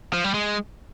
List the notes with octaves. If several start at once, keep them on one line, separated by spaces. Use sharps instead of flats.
F3
G3
G#3